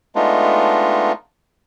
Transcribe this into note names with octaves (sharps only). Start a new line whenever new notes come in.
G#3 A3 B3 D4 D#4 F4